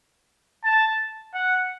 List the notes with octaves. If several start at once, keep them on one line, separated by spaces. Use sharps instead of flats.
A5
F#5